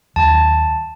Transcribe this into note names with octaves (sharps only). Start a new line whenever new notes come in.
D#2 F#3 A5